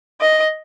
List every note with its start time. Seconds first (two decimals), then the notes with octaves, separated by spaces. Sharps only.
0.21 D#5